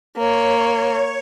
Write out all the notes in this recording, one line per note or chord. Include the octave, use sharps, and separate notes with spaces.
A#3 C#5